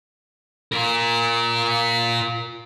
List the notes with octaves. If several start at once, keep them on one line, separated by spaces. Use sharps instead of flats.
F4 A#4